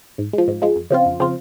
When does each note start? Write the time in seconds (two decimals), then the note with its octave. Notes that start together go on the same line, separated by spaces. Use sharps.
0.18 G#2
0.33 F3 G#3
0.48 G#2
0.62 F3 G#3
0.76 F2
0.90 C#3 F3 C4 F4
1.06 F2
1.20 C#3 F3 C4 F4